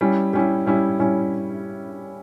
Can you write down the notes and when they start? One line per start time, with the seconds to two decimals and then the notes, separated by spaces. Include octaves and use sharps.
0.01 G3 C#4 E4
0.33 G3 C#4 E4
0.66 G3 C#4 E4
0.99 G3 C#4 E4